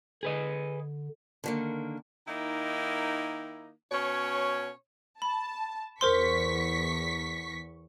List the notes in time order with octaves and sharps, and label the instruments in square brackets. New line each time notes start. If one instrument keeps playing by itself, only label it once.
[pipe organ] D3 [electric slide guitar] G#4 B4 D#5
[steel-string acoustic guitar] D3 D#3 A#3
[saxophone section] D#3 A#3 D#4 E4
B2 C#4 C#5
[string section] A5 [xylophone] B5
[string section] E2 C#6 B6 [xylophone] A#4 C5 C6